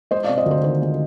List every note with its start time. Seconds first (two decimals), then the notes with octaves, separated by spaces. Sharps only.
0.11 G#3 C5 D#5
0.24 D5 F5
0.29 C3
0.38 C5 D#5
0.46 D2
0.51 C5
0.64 D#3 C5
0.82 G#3